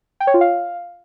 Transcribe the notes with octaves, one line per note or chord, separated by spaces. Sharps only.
G5
C#5
F4
F5